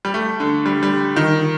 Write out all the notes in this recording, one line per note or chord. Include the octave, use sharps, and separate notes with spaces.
G3
A3
D3
G3
G3
D#3